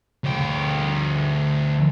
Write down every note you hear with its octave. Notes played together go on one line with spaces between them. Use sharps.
D2 G5